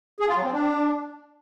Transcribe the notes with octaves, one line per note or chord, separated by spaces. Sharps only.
G#4
F4
F#3
C4
D4